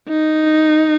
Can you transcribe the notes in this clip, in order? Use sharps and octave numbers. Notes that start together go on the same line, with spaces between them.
D#4